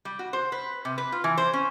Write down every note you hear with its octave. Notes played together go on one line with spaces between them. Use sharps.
G3
F#4
C5
B4
C3
B4
F4
E3
C5
C#4